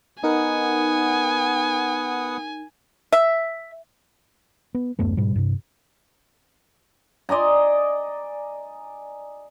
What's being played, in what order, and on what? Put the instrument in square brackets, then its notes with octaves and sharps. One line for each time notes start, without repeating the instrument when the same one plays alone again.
[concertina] B3 F#5 D#6 [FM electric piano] D#4 A#4 [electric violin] G#5
[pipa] E5
[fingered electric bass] B3
D1 F#2 A3 B3
G#2 B2 G3
G2 C3
[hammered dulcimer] D5 D#5 G#5 A#5